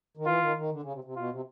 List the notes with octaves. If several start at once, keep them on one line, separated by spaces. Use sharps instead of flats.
D#3
E3 F4
D#3
D#3
D3
C#3
C3
C3
B2 F4
C3